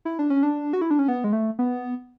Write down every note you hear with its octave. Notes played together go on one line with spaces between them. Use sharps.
E4
D4
C#4
D4
F#4
E4
D4
C#4
B3
G#3
A3
B3